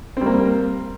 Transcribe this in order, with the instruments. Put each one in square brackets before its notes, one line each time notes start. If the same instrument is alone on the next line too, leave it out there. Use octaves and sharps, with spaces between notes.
[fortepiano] C4
G3
A#3